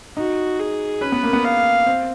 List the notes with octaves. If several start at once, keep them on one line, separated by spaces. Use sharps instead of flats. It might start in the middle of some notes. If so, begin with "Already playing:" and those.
D#4 F#4
G#4
C#4 B4
B3
A#3
B3
F5
C4